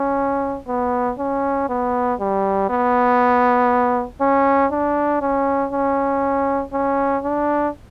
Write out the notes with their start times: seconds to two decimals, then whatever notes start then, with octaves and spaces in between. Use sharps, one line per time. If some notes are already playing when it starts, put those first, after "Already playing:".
Already playing: C#4
0.67 B3
1.19 C#4
1.69 B3
2.20 G3
2.69 B3
4.21 C#4
4.71 D4
5.21 C#4
5.72 C#4
6.72 C#4
7.23 D4